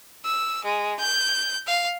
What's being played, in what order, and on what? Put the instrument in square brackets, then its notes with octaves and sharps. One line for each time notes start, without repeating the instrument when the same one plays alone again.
[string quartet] E6
G#3
G6
F5